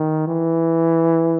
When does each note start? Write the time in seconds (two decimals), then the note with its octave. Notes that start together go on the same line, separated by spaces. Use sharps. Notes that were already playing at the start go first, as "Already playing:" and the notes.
Already playing: D#3
0.28 E3